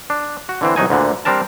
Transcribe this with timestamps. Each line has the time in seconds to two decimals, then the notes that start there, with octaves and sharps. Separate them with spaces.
0.10 D4
0.49 F#4
0.61 D3 E3 C4
0.76 C2 F#3 D#4 G#5
0.90 D2 A#2 D3
1.25 G3 C4 D4 A#4 A5